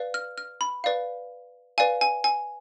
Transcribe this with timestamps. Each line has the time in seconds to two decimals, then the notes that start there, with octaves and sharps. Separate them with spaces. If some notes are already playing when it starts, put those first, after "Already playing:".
Already playing: B4 D5 F5
0.14 F6
0.38 F6
0.61 B5
0.84 B4 D5 F5
1.78 B4 D5 F5 G#5
2.01 G#5
2.24 G#5